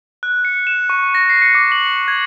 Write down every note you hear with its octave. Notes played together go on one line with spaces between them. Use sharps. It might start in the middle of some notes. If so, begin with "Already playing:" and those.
F#6
C#7
E7
C#6
A#6
C7
C#7
D6
F#7
C#7
G#6